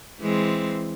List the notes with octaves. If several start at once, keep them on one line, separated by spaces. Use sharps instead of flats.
E3 G#3 C4